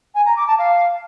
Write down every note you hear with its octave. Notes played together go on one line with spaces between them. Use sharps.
G#5
A#5
D6
A5
F5